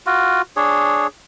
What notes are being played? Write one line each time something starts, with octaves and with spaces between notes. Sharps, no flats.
F4 F#4
D4 G#4 C#5